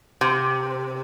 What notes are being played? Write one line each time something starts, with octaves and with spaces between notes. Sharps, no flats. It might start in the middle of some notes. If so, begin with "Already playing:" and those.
C3